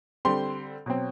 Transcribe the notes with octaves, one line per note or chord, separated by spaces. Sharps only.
D3 G3 C4 C6
B2 F#3 C4